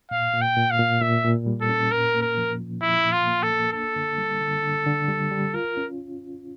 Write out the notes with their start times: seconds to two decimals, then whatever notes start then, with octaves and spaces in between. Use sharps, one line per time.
0.11 A#2 F5
0.34 A#2
0.41 G5
0.57 A#2
0.71 F5
0.79 A#2
1.02 A#2 E5
1.25 A#2
1.46 G3
1.61 A4
1.69 C#4
1.91 A#2 A#4
2.15 A#3
2.22 A#4
2.37 F3
2.60 F3
2.82 F3 E4
3.05 A#2
3.12 F4
3.27 A#3
3.43 A4
3.50 A#3
3.73 D4 A4
3.96 D3
4.18 G3
4.41 D3
4.63 D3
4.86 D3
5.08 G3
5.31 G3
5.54 F4 A#4
5.77 C#4